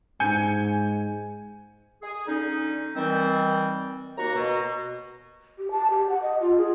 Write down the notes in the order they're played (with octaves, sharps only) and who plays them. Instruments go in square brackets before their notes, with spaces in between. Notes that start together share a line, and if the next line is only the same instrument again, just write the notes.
[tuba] G#2 [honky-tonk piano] G#5 G6 C#7
[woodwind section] G#4
D3 C#4 D#4
D#3 E3 G3 C4
D#2 A#3 F#4 A#5
B2
[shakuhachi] G4
A5
G4
F#5
D#5
F4
G#4